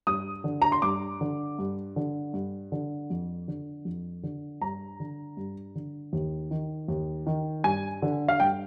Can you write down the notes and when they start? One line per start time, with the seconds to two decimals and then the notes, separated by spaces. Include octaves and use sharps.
0.07 G2 D#6
0.44 D3
0.62 A#5
0.72 C6
0.82 G2 D6
1.21 D3
1.59 G2
1.96 D3
2.34 G2
2.72 D3
3.10 F2
3.48 D3
3.85 F2
4.23 D3
4.61 G2 A#5
5.00 D3
5.37 G2
5.75 D3
6.13 D#2
6.51 D#3
6.88 D#2
7.27 D#3
7.64 G2 G#5
8.02 D3
8.28 F5
8.40 G2 G5